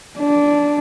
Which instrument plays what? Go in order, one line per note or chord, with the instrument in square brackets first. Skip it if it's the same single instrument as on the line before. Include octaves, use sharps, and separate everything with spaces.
[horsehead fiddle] D4